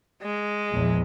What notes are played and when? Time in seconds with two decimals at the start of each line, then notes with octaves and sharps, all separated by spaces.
0.22 G#3
0.72 A#1 E2